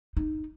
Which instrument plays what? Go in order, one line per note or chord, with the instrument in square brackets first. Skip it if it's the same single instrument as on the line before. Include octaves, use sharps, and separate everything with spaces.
[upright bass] D#4